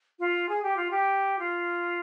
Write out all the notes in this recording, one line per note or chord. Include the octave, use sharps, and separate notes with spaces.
F4
G#4
G4
F4
G4
F4